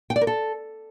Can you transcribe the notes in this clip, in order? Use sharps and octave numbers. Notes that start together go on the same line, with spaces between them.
G5
D5
A#4
A4